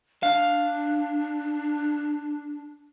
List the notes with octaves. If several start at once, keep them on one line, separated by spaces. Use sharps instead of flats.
D4 F5